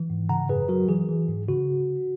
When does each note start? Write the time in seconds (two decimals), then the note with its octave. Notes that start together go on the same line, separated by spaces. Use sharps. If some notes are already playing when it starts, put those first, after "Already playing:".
Already playing: E3
0.10 G#2
0.29 C#3 F#5 A#5
0.49 F#2 G#4 B4
0.69 F#3 F#4 A#4
0.89 E3 G#4
1.08 E3
1.28 G#2
1.48 C#3 F#4